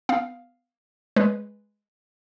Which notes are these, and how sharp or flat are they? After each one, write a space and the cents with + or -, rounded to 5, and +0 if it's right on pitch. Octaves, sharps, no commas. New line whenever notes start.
B3 +15 F5 +0
G#3 +0 B4 -5